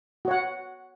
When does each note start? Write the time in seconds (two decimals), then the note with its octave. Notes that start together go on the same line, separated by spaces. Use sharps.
0.25 F#4
0.28 C#5
0.31 F#5